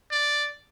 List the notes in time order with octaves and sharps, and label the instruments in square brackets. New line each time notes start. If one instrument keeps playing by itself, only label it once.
[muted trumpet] D5